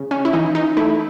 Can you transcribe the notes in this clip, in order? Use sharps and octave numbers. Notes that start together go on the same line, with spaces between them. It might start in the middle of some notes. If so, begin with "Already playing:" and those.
Already playing: C#3
C#4
E4
E3 D#4
D#4
A3 E4